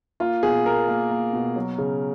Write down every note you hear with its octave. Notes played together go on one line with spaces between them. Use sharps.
A#3 F4
B2 G#4
B2 A#4
A#3
A#3
B2
F#3
C#3